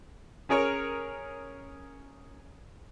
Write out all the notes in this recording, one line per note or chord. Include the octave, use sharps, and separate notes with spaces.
C#4 G#4 A#4 C#5